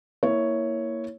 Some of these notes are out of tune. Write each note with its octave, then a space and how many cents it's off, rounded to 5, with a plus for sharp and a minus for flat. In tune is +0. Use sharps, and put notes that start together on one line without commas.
A#3 +0 E4 -10 C#5 +0